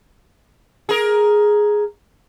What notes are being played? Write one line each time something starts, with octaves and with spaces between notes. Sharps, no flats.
G#4 A#4